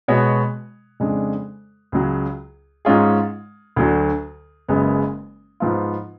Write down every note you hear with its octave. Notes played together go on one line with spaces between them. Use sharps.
B2 G#3 B3 F#4 C#5
F2 C#3 G#3 D4
C#2 C#3 F#3
G#2 G#3 C#4 F4 G#4
D2 D3 F#3
F#1 F#2 C#3 G#3 B3
G#2 F3 B3 F4